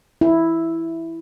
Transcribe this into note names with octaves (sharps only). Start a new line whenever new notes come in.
E4